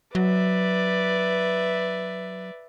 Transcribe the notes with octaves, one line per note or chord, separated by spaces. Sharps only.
F#3 B4 D5 E5